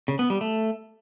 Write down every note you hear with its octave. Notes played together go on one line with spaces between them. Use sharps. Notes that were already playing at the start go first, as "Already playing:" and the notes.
C#3
B3
G3
A3